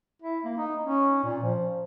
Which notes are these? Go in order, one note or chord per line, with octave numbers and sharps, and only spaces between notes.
E4
A#3
D#4
C#4
A#2
F3